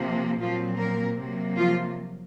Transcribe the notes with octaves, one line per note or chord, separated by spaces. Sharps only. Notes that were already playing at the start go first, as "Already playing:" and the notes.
Already playing: C3 F3 A#3
A#2 F3 F#3 C4 F4
A#3 A#4
C3 F#3 A#3
F3 F4